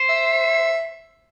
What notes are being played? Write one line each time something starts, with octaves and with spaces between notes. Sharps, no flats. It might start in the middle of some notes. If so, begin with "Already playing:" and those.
Already playing: C5
E5